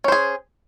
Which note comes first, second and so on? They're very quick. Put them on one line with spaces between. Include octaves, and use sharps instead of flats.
C#4 C5 G#4